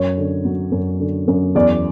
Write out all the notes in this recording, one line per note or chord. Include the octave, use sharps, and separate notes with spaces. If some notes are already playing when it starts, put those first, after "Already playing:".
Already playing: F#2 C#5
D3
F#3
F#2
D3
F#2
E2 D5